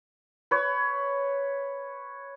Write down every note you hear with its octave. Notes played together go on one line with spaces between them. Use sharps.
B4 C#5